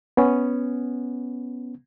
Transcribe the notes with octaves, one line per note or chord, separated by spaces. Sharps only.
B3 C#4